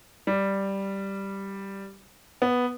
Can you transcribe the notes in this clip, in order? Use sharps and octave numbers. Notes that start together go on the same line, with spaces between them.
G3
B3